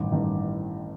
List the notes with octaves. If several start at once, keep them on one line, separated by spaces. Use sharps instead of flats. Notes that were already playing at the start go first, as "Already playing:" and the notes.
Already playing: A1 G2 D#3 D6
A1 G2 D#3